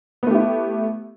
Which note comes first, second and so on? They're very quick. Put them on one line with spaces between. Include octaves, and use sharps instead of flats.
B3 A3 G4 E4